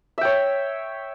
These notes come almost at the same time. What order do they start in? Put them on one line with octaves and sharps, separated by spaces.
E5 G5 C#5